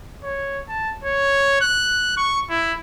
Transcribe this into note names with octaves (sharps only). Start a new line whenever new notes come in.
C#5
A5
C#5
F#6
C#6
E4